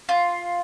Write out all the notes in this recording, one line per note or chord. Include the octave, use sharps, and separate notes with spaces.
F4